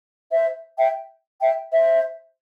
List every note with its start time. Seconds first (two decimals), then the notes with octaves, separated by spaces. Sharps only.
0.32 C5 E5
0.78 E5 G5
1.41 E5 G5
1.72 C5 E5